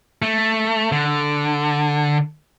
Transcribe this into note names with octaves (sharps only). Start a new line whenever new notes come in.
A3
D3